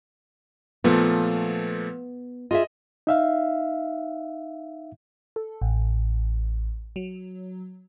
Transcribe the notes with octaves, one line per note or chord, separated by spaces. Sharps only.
A#2 F3 A3 B3
F4 G#4 D#5 E5
D#4 E5 F5
A4
A1
F#3